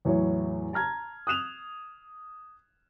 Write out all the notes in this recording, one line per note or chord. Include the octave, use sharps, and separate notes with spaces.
E2 A2 F#3 C#5
A5 A#5 F6 G#6
D#6 F#6 E7 F7